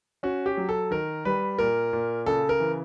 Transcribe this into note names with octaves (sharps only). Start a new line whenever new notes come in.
C#4 F#4
G4
F#3
A4
D#3 A#4
G3 B4
A#2 A#4
A#2
C#3 A4
A#4
E3